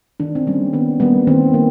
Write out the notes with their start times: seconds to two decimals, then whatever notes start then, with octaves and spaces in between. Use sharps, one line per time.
0.20 D#3 D4
0.35 C4
0.47 G3 A#3 C#4
0.73 D#3 B3
1.00 G3 A#3 B3
1.27 D#3 C4
1.54 A#3